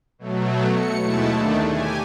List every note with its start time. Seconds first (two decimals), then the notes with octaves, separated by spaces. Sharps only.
0.19 B2 F#3 A3
0.70 C#7
1.02 D#2 B2 G#3 A3 E4 A5
1.37 D#2 D3 D#3 A3 D4
1.67 G4 G#5